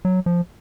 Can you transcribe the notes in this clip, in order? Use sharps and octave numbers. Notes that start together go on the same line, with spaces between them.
F#3
F3